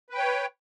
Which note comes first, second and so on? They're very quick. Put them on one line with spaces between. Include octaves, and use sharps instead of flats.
B4 G5 C#5